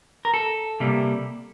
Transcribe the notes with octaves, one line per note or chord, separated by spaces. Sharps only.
A#4
A4
C3 G3 A#3